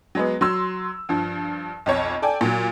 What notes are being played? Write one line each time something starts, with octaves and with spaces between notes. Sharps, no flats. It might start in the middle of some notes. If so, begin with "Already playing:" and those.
F#3 G#3 B3
F#3 C6 E6
G2 F3
B1 F2 C#5
A4 D5 G5 G#5
A#2 F#3